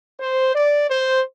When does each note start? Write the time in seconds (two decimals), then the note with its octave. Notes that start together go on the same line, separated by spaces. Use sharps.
0.20 C5
0.55 D5
0.89 C5